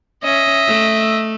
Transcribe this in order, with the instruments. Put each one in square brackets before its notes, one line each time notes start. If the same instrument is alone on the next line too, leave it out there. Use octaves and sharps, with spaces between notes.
[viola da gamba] C#4 [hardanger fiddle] D#5 E5
[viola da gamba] A3